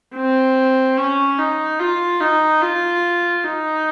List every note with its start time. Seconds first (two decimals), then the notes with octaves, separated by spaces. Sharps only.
0.15 C4
0.97 C#4
1.39 D#4
1.79 F4
2.20 D#4
2.62 F4
3.44 D#4